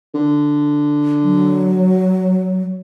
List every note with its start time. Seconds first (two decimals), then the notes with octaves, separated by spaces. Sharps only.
0.14 D3
1.23 F#3